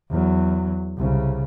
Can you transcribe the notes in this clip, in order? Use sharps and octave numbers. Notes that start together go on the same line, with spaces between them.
E2 F#3
C2 C#3